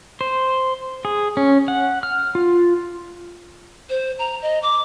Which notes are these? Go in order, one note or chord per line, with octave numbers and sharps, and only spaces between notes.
C5
G#4
C#4
F#5
F6
F4
C5
A#5
D#5
D6